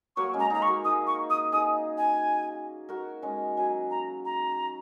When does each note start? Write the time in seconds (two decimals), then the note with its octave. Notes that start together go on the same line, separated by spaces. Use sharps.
0.16 F#3 A#3 C#6
0.33 G#3 C#4
0.40 A#5
0.50 D#4 G#4 A#5
0.62 C#6
0.67 F#4 A#4
0.85 D#4 G#4 D#6
1.07 C#6
1.30 D#6
1.52 D#4 G#4 D#6
1.98 G#5
2.89 F#4 A#4
3.22 G#3 C#4
3.57 F#3 G#5
3.91 A#5
4.25 A#5